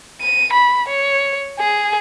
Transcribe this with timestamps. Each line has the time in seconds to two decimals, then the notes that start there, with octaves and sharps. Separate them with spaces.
0.21 D#7
0.53 B5
0.88 C#5
1.59 G#4